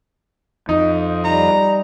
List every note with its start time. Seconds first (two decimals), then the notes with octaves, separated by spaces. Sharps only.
0.69 F2 D#4
1.24 G3 D#4 A#5